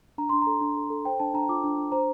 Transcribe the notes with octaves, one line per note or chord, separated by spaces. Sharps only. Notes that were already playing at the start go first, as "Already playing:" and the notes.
D4 A#5
D4 C6
A4 A#5
D4
A4
A4
C5 G5
D4 A5
D4 A#5
F4 D6
D4
D4
C5 A#5